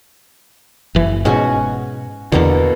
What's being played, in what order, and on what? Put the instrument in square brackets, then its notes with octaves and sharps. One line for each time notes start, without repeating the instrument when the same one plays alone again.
[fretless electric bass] F#1 E3
[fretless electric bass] G#2 B2 [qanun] C#4 F#4 G#5
[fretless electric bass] E2 D3 [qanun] B2 A#3 A4